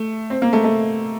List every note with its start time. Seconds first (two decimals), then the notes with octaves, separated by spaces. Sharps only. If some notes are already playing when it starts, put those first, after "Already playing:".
Already playing: A3
0.30 C4
0.42 A#3
0.53 A3
0.64 A3